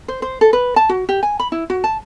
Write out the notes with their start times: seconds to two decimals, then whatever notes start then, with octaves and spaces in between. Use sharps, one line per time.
0.08 C5
0.22 C5
0.41 A4
0.53 B4
0.76 A5
0.89 F#4
1.09 G4
1.23 G#5
1.39 B5
1.52 E4
1.70 F#4
1.84 A5